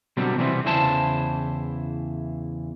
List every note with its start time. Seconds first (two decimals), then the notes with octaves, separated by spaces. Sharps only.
0.17 B2 D3 F#3 G3 B3 C4
0.38 C3 E3 G3 G#3 B3 C4
0.65 E2 C#3 E3 E4 C5 A5